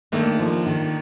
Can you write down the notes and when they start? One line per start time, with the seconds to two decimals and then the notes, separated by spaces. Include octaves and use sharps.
0.12 D#2 D#3 A3 A#3 D4
0.39 F3
0.66 D#3